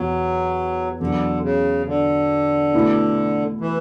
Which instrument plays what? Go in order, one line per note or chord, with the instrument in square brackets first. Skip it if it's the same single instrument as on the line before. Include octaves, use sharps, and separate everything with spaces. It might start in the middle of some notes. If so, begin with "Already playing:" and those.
Already playing: [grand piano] E2 B2 [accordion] F#3
[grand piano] E2 B2 F#3 [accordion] D3
[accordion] C#3
D3
[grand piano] B2 A3 E4
[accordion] E3